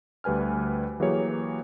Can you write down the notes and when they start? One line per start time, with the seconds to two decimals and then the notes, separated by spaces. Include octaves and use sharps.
0.24 D2 G3 B4 G#5 F6
1.00 E3 F#3 A#3 G4 G#4 C#5